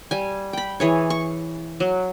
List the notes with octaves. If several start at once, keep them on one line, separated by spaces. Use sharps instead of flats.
G3 G#5
G5 B5
E3 G#4 C#5
C#6
F#3